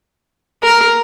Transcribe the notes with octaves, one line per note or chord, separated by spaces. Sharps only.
A#4